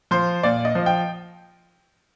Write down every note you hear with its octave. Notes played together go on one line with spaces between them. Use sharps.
F3 C5
A#2 D5
D#5
F3
G5